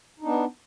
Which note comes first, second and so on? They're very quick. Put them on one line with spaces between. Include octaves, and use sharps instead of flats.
D#4 D4 B3